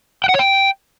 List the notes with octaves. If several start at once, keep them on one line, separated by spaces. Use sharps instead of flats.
G5
F#5
C#5
G5